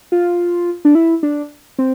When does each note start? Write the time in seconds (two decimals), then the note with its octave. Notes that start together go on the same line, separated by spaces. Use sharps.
0.12 F4
0.85 D4
0.95 E4
1.23 D4
1.79 C4